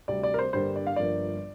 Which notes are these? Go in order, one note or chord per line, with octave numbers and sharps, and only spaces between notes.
D2 C3 G3 C4 D5
D5
A#4
C5
G2 D3 G3 A#3 C5
D5
F5
G1 G2 F3 A#3 D5